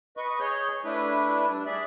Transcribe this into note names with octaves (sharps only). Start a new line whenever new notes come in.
B4 D#5 C#6
G#4 C#5 G6
A3 D4 E4 B4
G3 D4
G#4 D5 E5 F#6